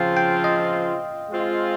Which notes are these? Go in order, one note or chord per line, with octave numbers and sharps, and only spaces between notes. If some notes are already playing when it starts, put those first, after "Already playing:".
Already playing: C#3 F3 C4 F4 F5 G5
G5
D#5
G#3 C4 F4